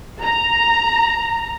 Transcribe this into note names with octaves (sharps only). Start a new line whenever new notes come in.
A#5